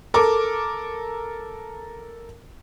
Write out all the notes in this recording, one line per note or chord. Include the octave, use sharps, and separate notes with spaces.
A4 A#4 D6